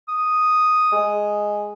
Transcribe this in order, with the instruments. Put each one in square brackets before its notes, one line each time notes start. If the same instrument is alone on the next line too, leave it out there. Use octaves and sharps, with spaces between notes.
[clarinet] D#6
[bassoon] G#3